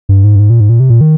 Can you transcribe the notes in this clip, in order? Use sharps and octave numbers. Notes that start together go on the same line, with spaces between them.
G2
G#2
G2
G#2
A#2
G#2
A#2
C3
A#2
D#3